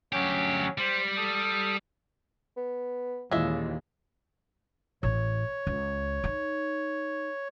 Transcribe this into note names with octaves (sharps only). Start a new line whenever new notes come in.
D2 F#3 C#4 G4
G3 C5
A4 D#6
B3
D#2 A#2 C#3 E3 G#3 F4 E5
A1 C#5
C#2
D#4